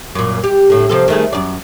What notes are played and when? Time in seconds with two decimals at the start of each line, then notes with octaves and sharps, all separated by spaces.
0.15 F#2 A#2
0.44 G4
0.70 A2 D3
0.89 C3 F3 A4
1.08 D#3 A3 G#4
1.33 F#2 D5